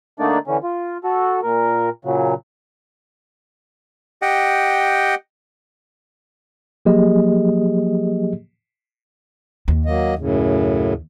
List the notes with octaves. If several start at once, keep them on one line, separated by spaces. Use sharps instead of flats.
D3 A3 A#3 D4 D#4 D5
D3 E3 C#4
F4
F#4 A4
A#2 A#4
A#2 C#3 F#3
G4 D#5 F#5 G5
F3 F#3 A#3 G4 G#4 D#5
D#2
F#3 A#3 D#5
F#2 A2 C#3